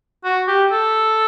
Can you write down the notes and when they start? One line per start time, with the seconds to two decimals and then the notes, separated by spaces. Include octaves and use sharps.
0.24 F#4
0.48 G4
0.72 A4